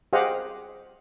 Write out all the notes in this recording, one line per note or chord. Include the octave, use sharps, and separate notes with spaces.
G4 G#4 C5 D#5 F5 F#5